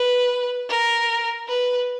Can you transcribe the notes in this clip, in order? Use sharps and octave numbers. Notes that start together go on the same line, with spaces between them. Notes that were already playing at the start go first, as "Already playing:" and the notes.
Already playing: B4
A#4
B4